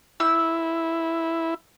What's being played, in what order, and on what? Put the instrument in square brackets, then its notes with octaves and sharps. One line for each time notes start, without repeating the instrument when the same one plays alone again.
[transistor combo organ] E4 [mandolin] E6